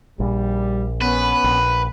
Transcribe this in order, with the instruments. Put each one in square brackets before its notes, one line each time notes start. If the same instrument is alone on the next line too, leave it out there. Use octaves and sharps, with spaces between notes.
[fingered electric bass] A#1 [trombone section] G3
[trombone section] B3 C#4 [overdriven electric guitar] B4
[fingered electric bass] A#1